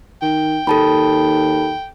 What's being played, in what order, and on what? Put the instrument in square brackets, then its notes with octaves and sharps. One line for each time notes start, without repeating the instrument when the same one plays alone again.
[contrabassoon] D#3 [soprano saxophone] G5
[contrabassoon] D#2 [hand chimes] A4 A5 B5